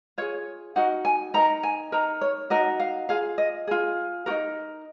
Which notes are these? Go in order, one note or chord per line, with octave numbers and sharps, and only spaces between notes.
F4 G#4 C#5
D#4 F#4 A#4 F#5
G#5
D#4 A#4 A#5
G#5
D#4 A#4 A#5
C#5
D#4 F#4 A#4 D#5
F5
F4 G#4 F5
D#5
F4 G#4
D#4 F#4 A#4